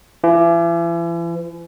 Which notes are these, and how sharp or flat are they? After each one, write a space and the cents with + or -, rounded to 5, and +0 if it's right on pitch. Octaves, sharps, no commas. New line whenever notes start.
E3 +40